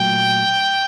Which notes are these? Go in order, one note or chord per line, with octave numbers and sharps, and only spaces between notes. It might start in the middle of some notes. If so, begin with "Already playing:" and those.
Already playing: A#2 F#3 A3 G5